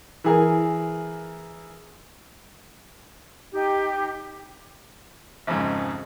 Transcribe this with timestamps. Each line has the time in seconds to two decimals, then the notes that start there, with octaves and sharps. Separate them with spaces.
0.24 E3 G#4 A#4
3.52 D#4 G4
5.47 G#1 F2 G#2 C#3 G#3